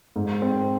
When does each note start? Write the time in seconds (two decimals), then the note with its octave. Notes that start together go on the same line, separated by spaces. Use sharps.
0.16 G#2
0.42 C4